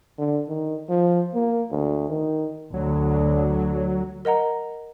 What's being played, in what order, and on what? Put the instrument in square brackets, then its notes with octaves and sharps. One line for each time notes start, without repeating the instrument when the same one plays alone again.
[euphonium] D3
D#3
F3
A#3
D2
D#3
[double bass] D2 [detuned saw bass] F#3
[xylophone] A#4 D#5 F#5 A#5